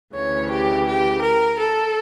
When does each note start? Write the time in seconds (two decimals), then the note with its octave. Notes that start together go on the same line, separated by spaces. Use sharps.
0.15 D2 C#3 E3 C#5
0.50 G4
0.86 G4
1.21 A#4
1.58 A4